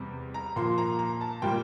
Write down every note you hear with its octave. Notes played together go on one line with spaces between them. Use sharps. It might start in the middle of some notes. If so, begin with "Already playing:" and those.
Already playing: E2 C3 G3
A#5
A#2 F3 C6
A#5
A#5
A5
A#2 G3 G5